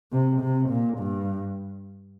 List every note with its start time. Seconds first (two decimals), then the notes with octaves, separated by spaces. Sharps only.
0.12 C3
0.41 C3
0.69 A#2
0.98 G2